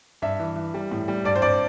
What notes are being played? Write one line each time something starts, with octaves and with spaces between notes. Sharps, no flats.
G2 E5
E3
E3
G3
A2
G3
G2 D5
C5
G2 D5